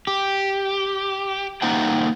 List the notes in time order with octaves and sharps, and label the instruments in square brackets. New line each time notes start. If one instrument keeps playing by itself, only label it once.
[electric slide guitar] G4
A#3 D#4 C5 F#5 G5